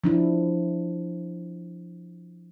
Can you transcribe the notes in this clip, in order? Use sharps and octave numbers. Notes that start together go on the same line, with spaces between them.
F3 D4 E4